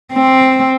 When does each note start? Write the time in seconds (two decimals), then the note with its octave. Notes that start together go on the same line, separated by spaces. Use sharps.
0.13 C4